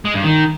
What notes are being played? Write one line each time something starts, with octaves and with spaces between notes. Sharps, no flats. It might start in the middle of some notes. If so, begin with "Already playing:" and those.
G#3
G2
D#3